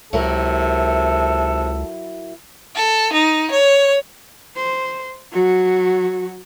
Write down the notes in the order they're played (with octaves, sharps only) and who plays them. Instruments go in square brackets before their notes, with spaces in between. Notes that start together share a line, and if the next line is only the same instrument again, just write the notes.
[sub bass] C#2 [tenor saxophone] C3 [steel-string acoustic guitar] F#3 E4 A#4 [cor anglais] A4
[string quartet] A4
D#4
C#5
[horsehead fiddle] C5
F#3 F#4